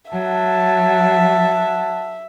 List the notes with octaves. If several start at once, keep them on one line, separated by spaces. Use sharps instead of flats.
F#3 E5 F#5 A5